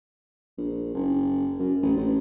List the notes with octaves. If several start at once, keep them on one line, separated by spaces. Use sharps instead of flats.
A#1
F#1
F#2
A1
A1